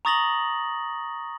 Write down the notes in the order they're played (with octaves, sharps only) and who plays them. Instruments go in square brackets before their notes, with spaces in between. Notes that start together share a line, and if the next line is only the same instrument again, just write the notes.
[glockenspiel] A#5 C#6 D#6 A6 A#6 F#7